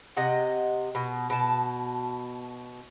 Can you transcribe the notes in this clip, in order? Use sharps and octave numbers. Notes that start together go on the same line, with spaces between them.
C3 D#5 F#5
B2
B2 A5